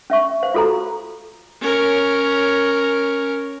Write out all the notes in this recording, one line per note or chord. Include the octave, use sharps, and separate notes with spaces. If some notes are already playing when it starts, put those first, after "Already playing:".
C#4 E5 C#6
C5 F5
F4 F#4 A4 C5 A#5
C#4 A#4